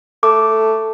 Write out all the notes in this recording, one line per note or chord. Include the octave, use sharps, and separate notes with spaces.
A3 D6